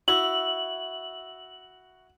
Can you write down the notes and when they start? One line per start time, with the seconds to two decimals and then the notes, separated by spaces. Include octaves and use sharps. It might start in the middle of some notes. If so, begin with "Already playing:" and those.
0.08 E4 F#4 F#7